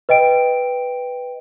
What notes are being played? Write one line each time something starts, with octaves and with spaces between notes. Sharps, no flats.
B4 D#5 G5 D7